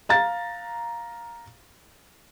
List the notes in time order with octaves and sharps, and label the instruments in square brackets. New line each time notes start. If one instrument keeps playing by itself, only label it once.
[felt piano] F5 A#5 A6